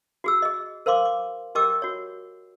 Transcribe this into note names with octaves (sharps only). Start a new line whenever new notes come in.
F#4 G#4 E6
G#4 D#5
A#4 C5 F5 C6 D6
D6
G4 A#4 D#5 G5 D6 E6
F#4 C#5